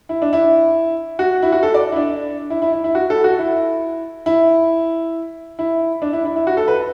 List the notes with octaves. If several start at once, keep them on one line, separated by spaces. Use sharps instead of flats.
E4
D4
E4
F#4
E4
F#4
A4
D5
E4
D4
E4
E4
E4
E4
F#4
A4
F#4
E4
E4
E4
D4
E4
E4
E4
F#4
A4
B4